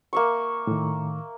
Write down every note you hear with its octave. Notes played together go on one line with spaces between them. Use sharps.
A#3 E5 C#6
A2 D#3